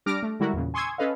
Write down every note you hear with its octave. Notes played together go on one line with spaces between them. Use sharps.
G3 D4 D6 F6 A#6 D7
A3
D3 G3 G#3 E4 F#4 A#4
E2 A#2 C#3
G#5 C6 C#6 D#6 E6 G#6
C#4 A4 B4 D#5 F5